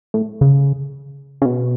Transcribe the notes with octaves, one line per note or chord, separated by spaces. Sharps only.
A2
C#3
C#3
B2